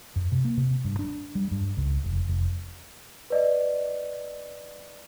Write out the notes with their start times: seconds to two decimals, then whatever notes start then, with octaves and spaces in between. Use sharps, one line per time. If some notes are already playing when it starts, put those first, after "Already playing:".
0.16 F#2
0.32 C3
0.45 A#3
0.57 C3
0.84 G2
0.99 D4
1.35 G3
1.51 G2
1.77 C#2
2.04 F1
2.29 F1
3.30 B4 D5 D#5